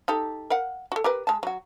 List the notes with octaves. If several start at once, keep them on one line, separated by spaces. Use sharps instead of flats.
D#4 G4 A4
A#4 F5 F#5
F#4 A4
G4 A#4 B4
G#3 A5
F#3 F#4